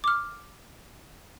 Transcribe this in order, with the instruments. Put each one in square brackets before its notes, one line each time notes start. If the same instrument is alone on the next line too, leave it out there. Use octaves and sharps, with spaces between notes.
[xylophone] D6 F6